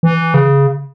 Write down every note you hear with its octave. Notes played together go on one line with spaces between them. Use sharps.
E3
C#3